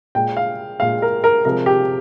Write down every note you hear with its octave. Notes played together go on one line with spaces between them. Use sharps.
A#2 G#3 G5
F5
A#2 G#3 F5
A#4
A#4
C3 F3 G#3 A#4
G4